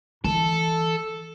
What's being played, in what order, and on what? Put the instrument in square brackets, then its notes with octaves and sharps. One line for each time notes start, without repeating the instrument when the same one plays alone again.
[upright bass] E3 [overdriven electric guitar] A4